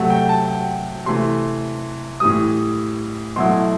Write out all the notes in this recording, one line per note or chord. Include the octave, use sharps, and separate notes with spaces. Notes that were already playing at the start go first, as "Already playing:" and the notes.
Already playing: C3 F#3 A3 F#5
G5
A5
G5
C3 E3 A3 C6
A2 E3 G3 D#6
B2 F#3 A3 E4 C6